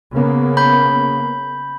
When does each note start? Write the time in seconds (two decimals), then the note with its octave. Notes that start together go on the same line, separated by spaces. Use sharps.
0.11 C#3 A#3 B3
0.57 B5 G6